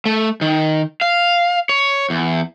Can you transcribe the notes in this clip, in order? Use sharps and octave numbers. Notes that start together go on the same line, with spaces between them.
A3
D#3
F5
C#5
E2